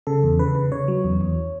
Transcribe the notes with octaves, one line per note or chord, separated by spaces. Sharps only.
C#3 A4
E2
C#3 B4
C#3
C#3 C#5
F#3
E2
E2